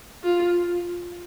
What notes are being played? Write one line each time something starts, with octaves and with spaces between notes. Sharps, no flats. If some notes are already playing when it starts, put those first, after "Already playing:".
F4